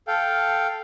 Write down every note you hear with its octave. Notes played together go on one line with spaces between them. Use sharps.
A4 F5 G5